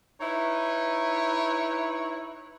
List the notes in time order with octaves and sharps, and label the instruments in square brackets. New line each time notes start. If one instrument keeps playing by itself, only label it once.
[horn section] D#4 E4 B4 C#5